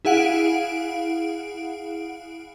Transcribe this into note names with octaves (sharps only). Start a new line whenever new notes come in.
E4 G#4 F5 F#5 D7